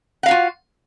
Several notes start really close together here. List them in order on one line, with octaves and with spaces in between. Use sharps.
F#5 F5 F#4 F4